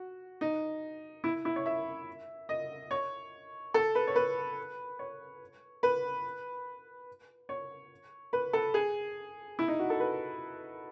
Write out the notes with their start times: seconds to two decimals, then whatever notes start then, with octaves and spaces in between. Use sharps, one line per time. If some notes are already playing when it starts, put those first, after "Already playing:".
Already playing: F#4
0.41 D#4
1.24 E4
1.45 E4
1.56 C#5
1.66 E5
2.49 D#5
2.91 C#5
3.74 A4
3.95 B4
4.07 C#5
4.16 B4
4.99 C#5
5.83 B4
7.49 C#5
8.33 B4
8.53 A4
8.74 G#4
9.59 E4
9.68 D#4
9.79 F#4
9.90 A4
10.00 B4